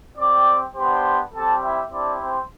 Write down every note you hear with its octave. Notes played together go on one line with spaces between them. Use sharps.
C4 G4 D5 D6
B3 D4 G4 C5 C6
G3 C4 G4 A4 A5
E4 E5
C4 D4 E4 G4 D5
C4 C5